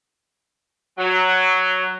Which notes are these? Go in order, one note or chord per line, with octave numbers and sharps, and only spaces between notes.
F#3